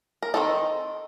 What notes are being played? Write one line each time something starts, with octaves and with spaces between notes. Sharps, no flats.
A#4
D#3 G#3 C4 D#4 A4